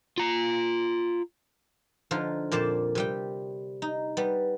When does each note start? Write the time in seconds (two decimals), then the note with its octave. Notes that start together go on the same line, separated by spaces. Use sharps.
0.18 F4 A#5
2.11 D3 F3 D#4 F4
2.51 F2 A#2 C5 D5 A5
2.95 C3 G3 G5
3.82 D#4
4.17 G3 B3